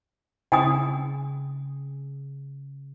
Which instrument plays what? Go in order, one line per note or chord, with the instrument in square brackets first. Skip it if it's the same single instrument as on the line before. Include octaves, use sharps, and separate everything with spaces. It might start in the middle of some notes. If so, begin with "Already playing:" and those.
[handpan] C#3 [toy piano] G5 G#5 D#6